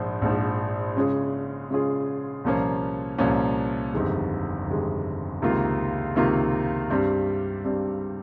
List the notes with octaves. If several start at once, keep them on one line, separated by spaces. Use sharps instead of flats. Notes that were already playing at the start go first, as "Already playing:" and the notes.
Already playing: A#1 G#2 F3
A#1 G#2 F3
C#3 G#3 C#4 F4 G#4
C#3 G#3 C#4 F4 G#4
C2 A#2 F3 A#3 C#4
C2 A#2 F3 A#3 C#4
G1 F2 C3 D#3 G#3
G1 F2 C3 D#3 G#3
C#2 C3 D#3 A#3 F4
C#2 C3 D#3 A#3 F4
G2 G3 C4
G2 G3 C4